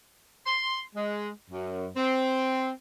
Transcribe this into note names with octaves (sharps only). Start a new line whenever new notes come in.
C6
G#3
F#2
C4